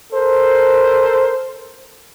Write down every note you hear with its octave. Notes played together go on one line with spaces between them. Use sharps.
A4 A#4 C5